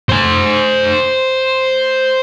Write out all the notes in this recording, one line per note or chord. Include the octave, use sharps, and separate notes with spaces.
C5 G#5